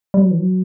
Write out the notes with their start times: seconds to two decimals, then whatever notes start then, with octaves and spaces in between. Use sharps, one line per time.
0.14 G3
0.22 F#3
0.31 E3
0.40 F#3